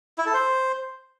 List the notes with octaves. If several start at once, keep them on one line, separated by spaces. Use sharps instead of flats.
E4
A4
C5